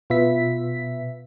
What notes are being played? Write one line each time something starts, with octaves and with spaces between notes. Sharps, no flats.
B2 F4 B4 E5 B6